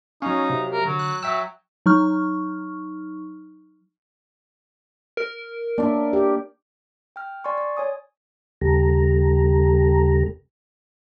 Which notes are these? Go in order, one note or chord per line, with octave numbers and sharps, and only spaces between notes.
F#3 C#4 D#4 F5
C3
A#4
D3 F#3
F#6
F#3 E5 G5 E6
F#3 D#4 C#6 F6
A#4
A#3 D4 D5 E5
G4
G5 F6
D5 G#5 C6 C#6
D5
C#5 G#5 D#6
D#2 C#3 G3 G4 A4 A#5